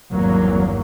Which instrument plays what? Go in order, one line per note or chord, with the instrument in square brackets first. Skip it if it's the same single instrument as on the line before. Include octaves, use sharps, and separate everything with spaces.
[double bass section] G#1 E2 G2 F#3 A#3